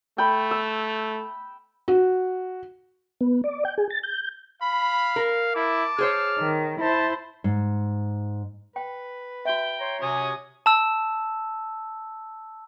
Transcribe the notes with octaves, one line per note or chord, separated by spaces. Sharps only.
A3 G5 B5
E6
F#4
B3
D5
G5
G#4
A6
G6
F5 B5
A#4
E4 A5 D6
G#4 C5 C#5 F6
D#3
E4 C5 A5
G#2
B4 G5
F#4 E5 G5
C#5 A#5 C6
C3 F#3 C#4 C#5 G#5 D#6
A5 E6